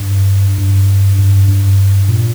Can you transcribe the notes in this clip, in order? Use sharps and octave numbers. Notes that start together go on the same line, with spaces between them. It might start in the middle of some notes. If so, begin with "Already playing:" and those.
Already playing: G2
G2
G2
G2
A#2